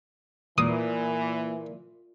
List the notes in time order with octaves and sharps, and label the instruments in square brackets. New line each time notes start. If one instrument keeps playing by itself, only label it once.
[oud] A#2 [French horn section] E3 [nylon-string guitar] A#3 [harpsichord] D#6